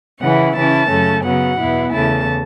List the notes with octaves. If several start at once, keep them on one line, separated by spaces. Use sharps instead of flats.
C#3 E3 C#4 E4 F#5
C#3 E3 C#4 E4 A5
F#2 C#3 A3 C#4
C#3 F#3 B3 F#5
E2 B2 B3 E4
E2 C#3 A3 A5